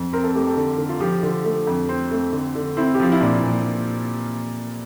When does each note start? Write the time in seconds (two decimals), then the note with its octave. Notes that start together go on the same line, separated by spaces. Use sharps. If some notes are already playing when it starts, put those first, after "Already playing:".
Already playing: F2
0.13 C4 A#4
0.24 A4
0.35 A3 G4
0.47 A4
0.56 D3
0.78 D3
0.89 F4
1.00 F3 G4
1.23 D3
1.44 A3
1.67 F2
1.89 C4
2.11 A3
2.33 D3
2.55 D3
2.77 C4 E4
2.94 G4
3.00 F3 F4
3.12 E4
3.21 A#2 D4
3.43 A#2